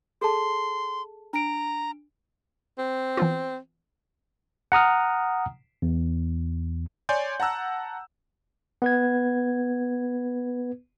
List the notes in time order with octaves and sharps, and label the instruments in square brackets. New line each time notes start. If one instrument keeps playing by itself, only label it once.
[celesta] G#4 A4 A5 [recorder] C6
[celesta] D4 D7 [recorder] A#5
[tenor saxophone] C4
[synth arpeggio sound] E3 B3 F4
[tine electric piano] F#5 A#5 D#6 F6
E2
[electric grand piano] C#5 D5 G#5 C6 G6
F#5 A5 A#5 E6 F#6
[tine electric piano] B3 B4 G#6